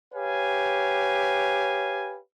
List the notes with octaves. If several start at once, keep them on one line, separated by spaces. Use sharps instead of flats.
G4 B4 C#5 F5 G#5